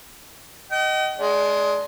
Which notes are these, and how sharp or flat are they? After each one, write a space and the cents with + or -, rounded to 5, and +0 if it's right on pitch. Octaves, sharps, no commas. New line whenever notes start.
D#5 +0 G5 -45
G#3 +15 D4 -15